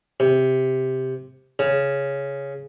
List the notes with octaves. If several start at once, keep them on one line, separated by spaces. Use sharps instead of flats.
C3
C#3